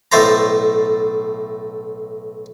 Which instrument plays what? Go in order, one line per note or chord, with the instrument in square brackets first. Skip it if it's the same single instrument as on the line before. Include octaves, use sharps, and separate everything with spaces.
[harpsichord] B1 A2 A3 C5 A#5